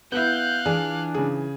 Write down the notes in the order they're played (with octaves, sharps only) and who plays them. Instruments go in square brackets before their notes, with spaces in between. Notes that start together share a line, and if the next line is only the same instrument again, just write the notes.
[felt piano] B3 E4 [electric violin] F5 F#6 [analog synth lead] G6
[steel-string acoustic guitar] E3 F4 [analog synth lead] D4 [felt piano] G#4
[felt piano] C#3 G#4